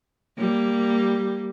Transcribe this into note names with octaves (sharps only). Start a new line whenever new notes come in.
G3 A#3